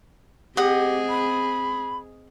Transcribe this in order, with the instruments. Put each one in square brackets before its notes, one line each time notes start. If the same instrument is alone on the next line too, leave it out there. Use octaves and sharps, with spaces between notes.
[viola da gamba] C4 G#4 [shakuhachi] G4 [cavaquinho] D#5 F#5
[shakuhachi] B5